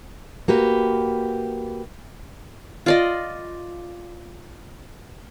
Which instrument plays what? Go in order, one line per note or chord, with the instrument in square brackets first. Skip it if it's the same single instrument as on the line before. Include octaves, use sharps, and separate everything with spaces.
[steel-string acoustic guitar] A#3 F#4 G4 B4
[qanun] F4 D5 D#5